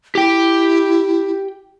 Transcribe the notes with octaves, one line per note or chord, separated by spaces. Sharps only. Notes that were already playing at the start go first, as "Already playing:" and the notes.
E4 G4 G5